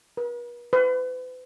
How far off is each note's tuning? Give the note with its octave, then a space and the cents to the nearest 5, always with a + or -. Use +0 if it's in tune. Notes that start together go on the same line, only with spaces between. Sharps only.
B4 -45
B4 +40